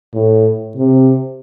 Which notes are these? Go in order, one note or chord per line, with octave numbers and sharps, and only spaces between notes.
A2
C3